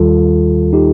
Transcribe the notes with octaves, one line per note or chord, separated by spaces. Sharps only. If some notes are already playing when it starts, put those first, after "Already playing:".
Already playing: D#2 D#3 G3 F4 A4
D#4 G4